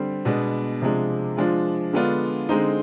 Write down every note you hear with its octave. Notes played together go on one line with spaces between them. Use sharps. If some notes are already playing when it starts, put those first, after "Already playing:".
Already playing: D3 G3 C4
B2 G#3 B3 D4
C3 F3 G#3 D4
F3 G#3 D4 F4
D3 G#3 B3 D4 F4
D3 G#3 C4 D#4